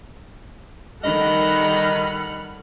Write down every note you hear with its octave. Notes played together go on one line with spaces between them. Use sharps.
D#3 G3 A4 D#5 F#5 B5 F6